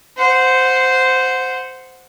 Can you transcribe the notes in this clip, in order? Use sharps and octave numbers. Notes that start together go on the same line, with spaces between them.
C5 F#5